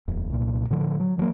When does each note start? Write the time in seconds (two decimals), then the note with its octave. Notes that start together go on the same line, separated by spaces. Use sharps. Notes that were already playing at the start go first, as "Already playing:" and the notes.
0.08 D#1 F2
0.30 C2 A#2
0.70 A2 D3 F3
1.00 F#3
1.18 E3 F#3 G3 A#3